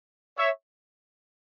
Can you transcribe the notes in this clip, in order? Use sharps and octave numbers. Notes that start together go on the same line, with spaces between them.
C#5 E5